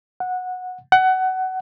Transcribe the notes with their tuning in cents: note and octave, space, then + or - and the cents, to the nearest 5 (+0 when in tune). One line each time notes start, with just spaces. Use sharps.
F#5 -15
F#5 +20